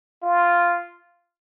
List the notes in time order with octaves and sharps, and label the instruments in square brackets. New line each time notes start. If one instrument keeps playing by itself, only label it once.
[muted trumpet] F4